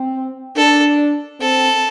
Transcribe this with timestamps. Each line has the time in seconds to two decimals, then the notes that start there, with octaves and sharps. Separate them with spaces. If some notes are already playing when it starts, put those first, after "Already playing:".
Already playing: C4
0.56 D4 A4
1.39 C4 A4